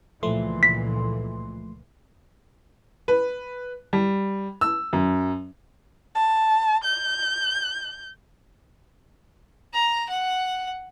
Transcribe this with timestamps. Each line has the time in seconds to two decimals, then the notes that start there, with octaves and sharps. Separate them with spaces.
0.23 C#2 A#2 E3 F3 A3 C6
0.63 B6
3.08 B4
3.93 G3
4.61 E6
4.93 F#2
6.15 A5
6.84 G6
9.74 A#5
10.09 F#5